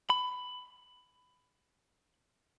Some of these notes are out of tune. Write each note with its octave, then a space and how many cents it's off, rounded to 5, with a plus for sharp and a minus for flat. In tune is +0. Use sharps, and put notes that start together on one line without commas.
B5 +15